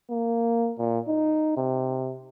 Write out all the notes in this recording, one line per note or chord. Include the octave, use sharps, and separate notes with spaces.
A#3
A#2
D#4
C3